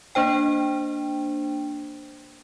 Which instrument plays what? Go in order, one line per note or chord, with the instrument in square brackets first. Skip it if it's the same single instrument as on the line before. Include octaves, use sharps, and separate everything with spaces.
[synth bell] A#3 D4 C5 G5